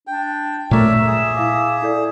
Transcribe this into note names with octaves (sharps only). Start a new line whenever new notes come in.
D4 G5
A#2 A3 A#4 C#5 D5 E5
G#4
E4 F5 D6
E4 A4 D5